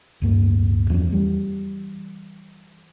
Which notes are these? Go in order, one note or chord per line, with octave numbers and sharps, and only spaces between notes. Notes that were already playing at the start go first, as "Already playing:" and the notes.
D1 G2 A#3
E2 F3 F#3 C#4
E3 G3